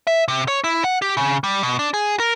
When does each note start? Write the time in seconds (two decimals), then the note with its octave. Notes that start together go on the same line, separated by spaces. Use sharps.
0.07 E5
0.28 C3
0.48 C#5
0.64 E4
0.84 F#5
1.02 G4
1.17 C#3
1.44 G3
1.63 B2
1.79 D4
1.94 G#4
2.20 A#4